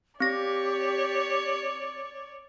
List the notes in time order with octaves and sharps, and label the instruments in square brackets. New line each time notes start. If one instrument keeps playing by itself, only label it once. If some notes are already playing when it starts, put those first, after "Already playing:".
[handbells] C4 A#6 [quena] G4 [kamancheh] C#5 D5